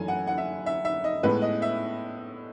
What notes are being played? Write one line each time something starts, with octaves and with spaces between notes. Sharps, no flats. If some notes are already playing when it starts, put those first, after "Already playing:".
Already playing: F#2 E3 A3 G#5
F#5
F#5
E5
E5
E5
D#5
A2 G#3 B3 B4
D#5
E5